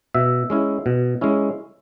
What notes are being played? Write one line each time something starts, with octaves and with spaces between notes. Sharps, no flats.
B2 E5
G#3 C#4 E4
B2
G#3 C#4 E4